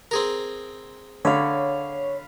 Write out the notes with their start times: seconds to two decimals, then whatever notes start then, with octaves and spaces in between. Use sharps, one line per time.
0.11 C4 G#4 A#4
1.25 D3 C#5 F5 B5